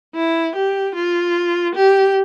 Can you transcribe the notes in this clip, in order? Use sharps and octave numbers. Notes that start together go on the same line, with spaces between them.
E4
G4
F4
G4